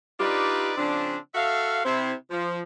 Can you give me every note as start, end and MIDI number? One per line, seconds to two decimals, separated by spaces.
0.20 0.73 62
0.20 0.73 63
0.20 0.73 65
0.20 0.73 67
0.20 0.73 71
0.20 0.73 74
0.78 1.16 49
0.78 1.16 53
0.78 1.16 60
0.78 1.16 62
1.35 1.80 66
1.35 1.80 69
1.35 1.80 76
1.35 1.80 77
1.85 2.12 48
1.85 2.12 60
1.85 2.12 64
2.30 2.60 53